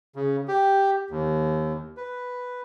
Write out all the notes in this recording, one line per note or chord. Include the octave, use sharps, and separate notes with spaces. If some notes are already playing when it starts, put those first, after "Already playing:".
C#3
G4
D#2
B4